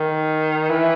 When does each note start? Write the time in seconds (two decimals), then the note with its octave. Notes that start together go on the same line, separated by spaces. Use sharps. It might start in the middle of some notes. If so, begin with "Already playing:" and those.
Already playing: D#3
0.69 E3